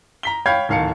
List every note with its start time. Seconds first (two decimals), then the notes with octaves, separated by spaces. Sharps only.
0.23 A#5 B6 G7
0.46 C#5 F5 G5 B5 G6 G#6
0.69 D1 D#3 F5 A5 C#7